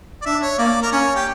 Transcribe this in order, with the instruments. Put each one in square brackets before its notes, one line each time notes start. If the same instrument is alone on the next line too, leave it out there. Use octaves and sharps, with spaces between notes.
[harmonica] D5
[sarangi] D4 [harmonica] E5
[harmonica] C#5
[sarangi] A#3 [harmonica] D5
[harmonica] A#4
[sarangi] C#4 [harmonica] C#5
[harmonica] G4